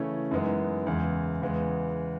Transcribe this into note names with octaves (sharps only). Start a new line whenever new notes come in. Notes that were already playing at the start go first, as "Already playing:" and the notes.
Already playing: C#3 E3 A3 C#4 E4
F#2 E3 G#3 B3 D#4
E2 C#3 E3 G#3
E2 C#3 G#3 B3